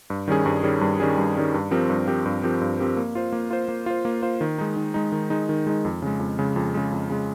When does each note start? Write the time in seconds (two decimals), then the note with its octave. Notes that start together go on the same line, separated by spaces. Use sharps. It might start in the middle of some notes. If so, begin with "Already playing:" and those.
0.10 G2
0.28 D#3 G3 C#4 G#4
0.46 G2
0.64 D#3 G3 C#4 G#4
0.81 G2
1.00 D#3 G3 C#4 G#4
1.18 G2
1.36 D#3 G3 C#4 G#4
1.54 G2
1.71 F3 C4 G4 A#4
1.90 G2
2.08 F3 C4 G4 A#4
2.26 G2
2.43 F3 C4 G4 A#4
2.61 G2
2.79 F3 C4 G4 A#4
2.97 A#3
3.15 F4 C5
3.32 A#3
3.51 F4 C5
3.68 A#3
3.86 F4 C5
4.05 A#3
4.22 F4 C5
4.41 D#3
4.58 G#3 D#4
4.77 D#3
4.94 G#3 D#4
5.12 D#3
5.30 G#3 D#4
5.49 D#3
5.67 G#3 D#4
5.85 F2
6.02 C#3 G#3
6.20 F2
6.39 C#3 G#3
6.56 F2
6.74 C#3 G#3
6.92 F2
7.10 C#3 G#3